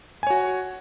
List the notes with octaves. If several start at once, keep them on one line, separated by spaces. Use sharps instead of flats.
F#4 C#5 G#5